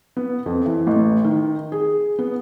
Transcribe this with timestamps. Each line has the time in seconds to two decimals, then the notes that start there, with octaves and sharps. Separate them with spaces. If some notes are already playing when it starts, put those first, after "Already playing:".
0.17 B3
0.46 F2
0.66 E3
0.87 A1
1.24 D#3
1.72 G#4
2.19 B3